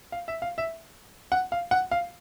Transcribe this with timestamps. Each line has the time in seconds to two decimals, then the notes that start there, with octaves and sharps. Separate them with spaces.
0.12 F5
0.28 E5
0.42 F5
0.58 E5
1.32 F#5
1.52 F5
1.71 F#5
1.91 F5